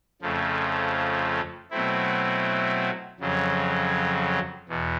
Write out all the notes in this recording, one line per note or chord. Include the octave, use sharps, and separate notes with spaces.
F2 C#3 F3 A3
B2 F#3 A3 C4 E4
F2 C#3 F#3
E2 B2